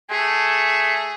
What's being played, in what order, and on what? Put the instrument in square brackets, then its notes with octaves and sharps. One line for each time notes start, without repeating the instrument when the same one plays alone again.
[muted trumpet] A3 [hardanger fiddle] G#4